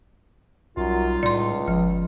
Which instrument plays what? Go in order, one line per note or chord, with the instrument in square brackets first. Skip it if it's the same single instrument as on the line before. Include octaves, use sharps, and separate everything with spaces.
[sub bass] B1 [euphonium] F#2 [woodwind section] G3 D#4 F4
[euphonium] C#2 [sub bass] A2 [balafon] D5 C6
[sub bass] G1 [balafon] F3